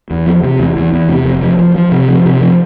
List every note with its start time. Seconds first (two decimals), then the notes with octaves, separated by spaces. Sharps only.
0.11 E2
0.26 F3
0.44 C3
0.59 E2
0.76 E2
0.93 E2
1.09 C3
1.25 F1
1.42 F3
1.59 F3
1.75 F3
1.92 C3
2.08 F3
2.25 C3
2.41 F3